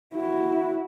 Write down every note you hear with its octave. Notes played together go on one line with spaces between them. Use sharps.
E4 F#4